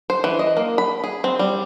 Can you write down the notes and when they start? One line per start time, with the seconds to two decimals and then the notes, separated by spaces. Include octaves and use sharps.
0.10 C5
0.24 E3
0.39 D#5
0.57 A#3
0.78 B5
1.04 G#4
1.24 C4
1.39 G3